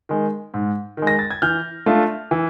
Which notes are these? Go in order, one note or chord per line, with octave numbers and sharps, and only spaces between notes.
D#3 G#3
G#2
D#3 G#3
A#6
A6
G#6
E3 F6 G6
A3 D4 F4
E3